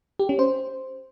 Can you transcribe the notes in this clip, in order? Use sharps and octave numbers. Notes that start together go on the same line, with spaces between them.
G4
C#4
C5